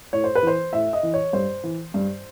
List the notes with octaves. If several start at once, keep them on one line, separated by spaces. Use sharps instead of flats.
A2 C#5
C5
B4
E3 C5
A2 E5
D#5
E3
C#5
G2 C5
E3
G2